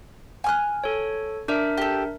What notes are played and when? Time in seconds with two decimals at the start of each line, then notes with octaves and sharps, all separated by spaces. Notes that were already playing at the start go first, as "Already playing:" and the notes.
0.44 G#5 F6 F#6
0.84 A4 C#5
1.48 D4 A#4 D5 E5
1.78 G4 A4